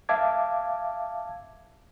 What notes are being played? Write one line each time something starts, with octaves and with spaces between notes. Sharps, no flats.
E5 F5 A5 D6 G#6